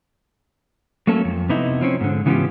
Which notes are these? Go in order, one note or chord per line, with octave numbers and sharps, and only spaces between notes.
F#3 A3 A#3 C#4 A4
F2
C3 B3 D#4 E4
F3 C4 C#4
G#2 D3
C#3 E3 B3 C#4 F4 G4